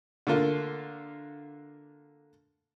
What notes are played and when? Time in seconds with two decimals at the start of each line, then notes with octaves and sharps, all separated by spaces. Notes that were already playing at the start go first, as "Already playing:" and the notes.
0.27 D3 A3 A#3 F4